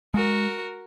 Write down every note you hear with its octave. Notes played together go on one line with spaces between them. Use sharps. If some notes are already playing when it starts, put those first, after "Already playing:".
G#3 F#4 A#4